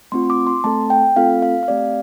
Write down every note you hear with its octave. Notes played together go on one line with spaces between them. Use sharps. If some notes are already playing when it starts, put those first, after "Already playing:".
A3 C4 F4 C6
D6
C6
A3 C4 A4 A5
G5
A3 C4 F4 A4 F5
F5
F5
A3 C4 G4 D5